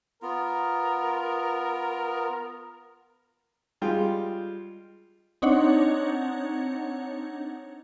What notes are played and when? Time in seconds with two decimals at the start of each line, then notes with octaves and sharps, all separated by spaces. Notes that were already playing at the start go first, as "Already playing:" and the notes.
0.22 B3 F4 A#4
3.82 G3 G#3 F4 G5
5.42 C4 D4 D#4 C#5 F#5